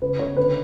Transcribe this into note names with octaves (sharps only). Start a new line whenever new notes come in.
C#3 B4
C#3 C#5
D3 B4